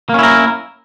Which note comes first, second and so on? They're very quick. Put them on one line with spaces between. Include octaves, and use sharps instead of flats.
A#3 C#4 E4 A#4